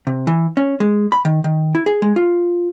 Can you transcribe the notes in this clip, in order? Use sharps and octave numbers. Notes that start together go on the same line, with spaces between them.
C3
E3
C#4
G#3
B5
D#3
D#3
E4
G#4
G#3
F4